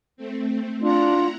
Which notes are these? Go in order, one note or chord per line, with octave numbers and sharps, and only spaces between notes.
A3 C4
D4 E4 F4 F#5 A#5